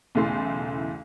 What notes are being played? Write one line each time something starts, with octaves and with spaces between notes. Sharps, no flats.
B1 E2 C#3 A3 E4 C6